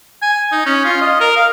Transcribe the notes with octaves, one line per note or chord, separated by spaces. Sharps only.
G#5
D#4
C#4
F4
D#5
A#4
F5